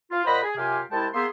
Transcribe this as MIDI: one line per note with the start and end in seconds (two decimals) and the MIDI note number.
0.11 0.24 65
0.25 0.41 46
0.25 0.41 72
0.25 0.41 75
0.25 0.41 78
0.25 0.41 83
0.43 0.56 68
0.56 0.80 42
0.56 0.80 48
0.56 0.80 65
0.56 0.80 67
0.56 0.80 77
0.56 0.80 80
0.91 1.07 36
0.91 1.07 56
0.91 1.07 64
0.91 1.07 79
0.91 1.07 81
1.14 1.26 58
1.14 1.26 59
1.14 1.26 68
1.14 1.26 76
1.14 1.26 84